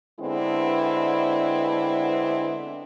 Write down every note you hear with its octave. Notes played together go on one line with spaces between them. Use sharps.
D3 G#3 B3 C4 D4 E4